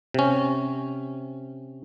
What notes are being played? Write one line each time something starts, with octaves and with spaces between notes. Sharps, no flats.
C3 C#4